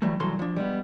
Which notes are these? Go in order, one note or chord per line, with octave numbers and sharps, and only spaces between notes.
E3 F#3 G3 A3
C2 G2 E3 F#3 A4 C6
F3 D4
G3 G#3 B3